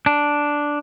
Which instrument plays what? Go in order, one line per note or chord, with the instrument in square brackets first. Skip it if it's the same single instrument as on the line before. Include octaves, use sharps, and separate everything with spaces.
[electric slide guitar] D4